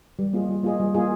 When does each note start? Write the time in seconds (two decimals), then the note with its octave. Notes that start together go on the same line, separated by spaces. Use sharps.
0.19 G3
0.33 A#3 F4 G#4 D#5
0.49 G3
0.64 A#3 F4 G#4 D#5
0.80 G3
0.95 A#3 F4 G#4 D#5